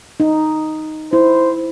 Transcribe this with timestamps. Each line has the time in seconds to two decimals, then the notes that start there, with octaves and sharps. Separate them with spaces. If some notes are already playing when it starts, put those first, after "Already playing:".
0.20 D#4
1.13 E4 C5